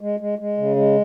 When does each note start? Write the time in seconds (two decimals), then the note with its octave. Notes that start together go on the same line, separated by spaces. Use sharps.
0.01 G#3
0.20 G#3
0.39 G#3
0.57 C#3
0.76 G#3